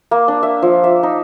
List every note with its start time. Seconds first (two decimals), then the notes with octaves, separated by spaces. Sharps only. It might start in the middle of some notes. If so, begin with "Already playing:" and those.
0.11 A#3
0.28 D4
0.43 E5
0.62 F3
0.84 E5
1.03 D#4